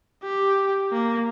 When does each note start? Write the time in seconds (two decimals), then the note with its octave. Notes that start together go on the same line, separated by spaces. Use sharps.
0.23 G4
0.92 A#3